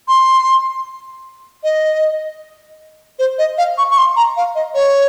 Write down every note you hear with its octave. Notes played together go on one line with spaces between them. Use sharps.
C6
D#5
C5
D#5
F5
C#6
C#6
C6
A#5
F5
D#5
C#5